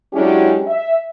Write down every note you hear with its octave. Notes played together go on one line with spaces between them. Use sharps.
F#3 G#3 C#4 D4 E4 G4
E5